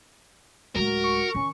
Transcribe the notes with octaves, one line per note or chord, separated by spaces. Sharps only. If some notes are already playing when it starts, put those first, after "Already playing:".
D1 G#3 F#4 A#4
C#6
D#3 C#4